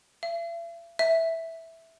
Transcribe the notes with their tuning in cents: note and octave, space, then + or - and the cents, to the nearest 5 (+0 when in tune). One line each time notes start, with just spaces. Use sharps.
E5 +45
E5 -5